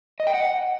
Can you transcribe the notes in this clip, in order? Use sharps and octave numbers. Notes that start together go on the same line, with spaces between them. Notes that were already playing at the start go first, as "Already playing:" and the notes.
D#5
G5
F#5